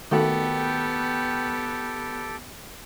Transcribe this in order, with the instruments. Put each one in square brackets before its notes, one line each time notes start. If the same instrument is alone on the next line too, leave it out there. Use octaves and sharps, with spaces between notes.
[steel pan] D#3 A3 F#4 [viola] B3 [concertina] G4 A4 G5